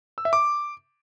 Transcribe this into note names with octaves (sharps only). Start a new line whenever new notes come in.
E6
E5
D6